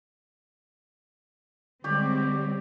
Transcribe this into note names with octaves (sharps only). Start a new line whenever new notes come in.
D3 G3 G#3 C4 G4 C#5 D5